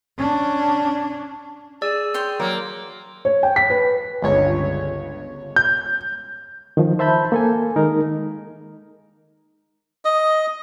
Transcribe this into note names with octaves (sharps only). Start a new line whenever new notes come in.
C#4 D4
G#4 D5 E6
C#5 G5 C6
F#3 A#3
C#5
G5
B6
B4
G1 C#2 C#5
G6
D#3 F3
C5 E5 A5 B5 G6
A#3 A4 G#5
D#3 G#3 D#4 A#4
D#5